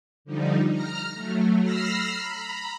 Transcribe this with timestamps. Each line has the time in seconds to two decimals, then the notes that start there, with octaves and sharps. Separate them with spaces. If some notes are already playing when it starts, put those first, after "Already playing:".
0.25 D3 F3 G3 D#4
0.70 A#5 F6
1.14 F#3 A3
1.62 B5 E6 F6 A#6 C7
2.16 A#5 B5